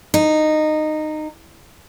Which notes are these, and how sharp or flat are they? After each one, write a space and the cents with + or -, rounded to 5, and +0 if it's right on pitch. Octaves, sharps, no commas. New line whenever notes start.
D#4 -15